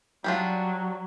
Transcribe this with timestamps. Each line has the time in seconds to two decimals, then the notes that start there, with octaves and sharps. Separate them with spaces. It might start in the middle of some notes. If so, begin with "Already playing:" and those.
0.24 F#3 G3 D4 F4